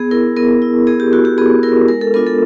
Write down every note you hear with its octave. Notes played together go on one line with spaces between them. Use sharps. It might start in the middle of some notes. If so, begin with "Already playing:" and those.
Already playing: B3 G#4
E4 A#4
B3 A#4
E4
B3 G#4
G4
E4 F#4
G4
B3 G#4
E4 A#4
G#3 A#4
A4
B3 D4 F4 A#4
A4